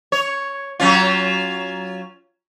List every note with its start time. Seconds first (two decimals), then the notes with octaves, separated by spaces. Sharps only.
0.12 C#5
0.80 F#3 C#4 F4